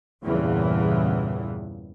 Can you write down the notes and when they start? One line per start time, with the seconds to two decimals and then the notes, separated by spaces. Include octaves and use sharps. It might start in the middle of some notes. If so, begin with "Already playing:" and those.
0.24 E2 G2 A#2 C#3 E3